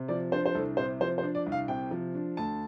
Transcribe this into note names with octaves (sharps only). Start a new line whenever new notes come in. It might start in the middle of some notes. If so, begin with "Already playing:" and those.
Already playing: C3
F3 D5
D4 C5
C5
C2 A4
C3 C5
F3 C5
C5
D4
D5
C2
F5
C3 G5
F3
D4
D2 A5